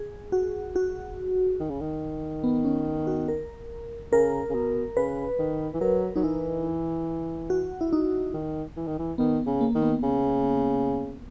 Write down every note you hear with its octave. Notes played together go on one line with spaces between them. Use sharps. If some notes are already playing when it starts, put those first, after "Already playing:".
Already playing: G#4
F#4
F#4
D#3
C#3
D#3
B3
C#4
F#4
A#4
C#3 A#4
C#3
B2
C#3 B4
D#3
E3
F#3 A#4
F#3 D#4
E3 E4
F#4
E4
D#4
D#3
E3
D#3
E3
D#3 B3
C#3
A#3
D#3
B3
C#3